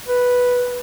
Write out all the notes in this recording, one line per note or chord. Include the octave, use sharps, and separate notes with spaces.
B4